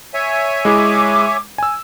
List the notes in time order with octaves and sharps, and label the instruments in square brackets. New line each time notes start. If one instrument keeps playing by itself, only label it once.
[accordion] C#5 E5 G#5
[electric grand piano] G#3 E4 G#4 [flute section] D6
[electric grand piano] G#5 E6